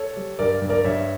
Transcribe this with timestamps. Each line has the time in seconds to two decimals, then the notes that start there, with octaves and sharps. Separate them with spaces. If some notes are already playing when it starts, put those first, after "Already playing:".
Already playing: A4 C#5
0.16 G3
0.39 G2 A#4 D5
0.62 G2
0.69 A#4 D5
0.85 G2 C#5 E5